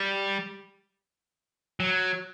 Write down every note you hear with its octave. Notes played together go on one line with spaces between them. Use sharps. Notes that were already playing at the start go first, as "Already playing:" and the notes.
Already playing: G3
F#3